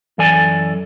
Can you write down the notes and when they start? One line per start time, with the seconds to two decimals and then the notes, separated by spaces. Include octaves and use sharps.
0.18 F#2 E3 A4 D5 G#5